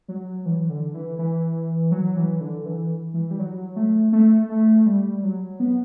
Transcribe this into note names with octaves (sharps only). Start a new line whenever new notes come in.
F#3
E3
D3
E3
E3
F#3
E3
D3
E3
E3
G3
F#3
A3
A3
A3
G3
F#3
B3